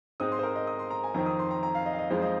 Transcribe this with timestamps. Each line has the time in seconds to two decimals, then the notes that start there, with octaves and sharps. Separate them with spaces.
0.20 G#2 G#3 C4 D#4 D#6
0.32 C6
0.39 C5
0.43 A#4
0.56 D#5
0.67 D#6
0.79 C6
0.91 A#5
1.04 G#5
1.14 F2 D#3 C4 D#4 A#5
1.26 D#6
1.39 C6
1.51 A#5
1.63 A#5
1.75 F5
1.86 D#5
1.93 F5
1.99 D#5
2.10 F2 F3 G#3 D#4 C5
2.22 D#5